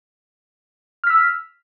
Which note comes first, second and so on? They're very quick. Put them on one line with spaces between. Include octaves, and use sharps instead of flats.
F6 B6 E6